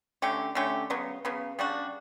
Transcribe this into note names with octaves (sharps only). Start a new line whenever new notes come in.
D3 A3 C#4 G4
D3 A3 C#4 G4
C#3 F#3 B3
C#3 F#3 B3
C#3 G3 D4 F#4